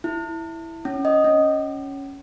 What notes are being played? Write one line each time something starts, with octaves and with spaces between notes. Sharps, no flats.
E4
C#4
D#5
C#4